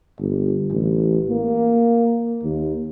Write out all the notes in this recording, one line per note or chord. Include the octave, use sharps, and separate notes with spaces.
G1
A1
A#3
D#2